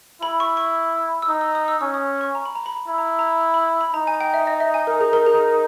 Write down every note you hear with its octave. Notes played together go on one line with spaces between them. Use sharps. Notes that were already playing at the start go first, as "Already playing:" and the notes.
E4 B5
C#6
C#6
E6
D#4 D#6
E6
D#6
E6
C#4 E6
D#6
D#6
C#6
A#5
B5
A#5
B5
A#5
E4 B5
A#5
B5
A#5
B5
B5
D#4 A#5
G#5
G5
E5
D#5
E5
G#5
A#4
G#4
A#4
G#4
A#4